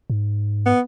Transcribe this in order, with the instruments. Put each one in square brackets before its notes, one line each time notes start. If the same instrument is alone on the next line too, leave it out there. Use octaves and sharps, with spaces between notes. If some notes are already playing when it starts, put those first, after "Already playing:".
[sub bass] G#2
[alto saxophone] B3